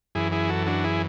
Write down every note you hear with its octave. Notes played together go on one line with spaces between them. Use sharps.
F#2 E3 E4 G#4
E4 G#4
F#4 A4
D4 F#4
E4 G#4